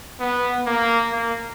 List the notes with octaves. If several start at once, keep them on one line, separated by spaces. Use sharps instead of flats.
B3
A#3
A#3